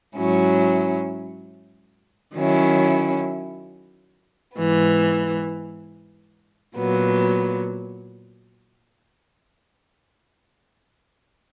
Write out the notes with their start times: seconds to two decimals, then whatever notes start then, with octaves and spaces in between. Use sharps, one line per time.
0.16 G#2 F#3 C#4 E4
2.37 D#3 F#3 C#4 E4
4.57 G#2 E3 B3
6.77 A#2 F#3 B3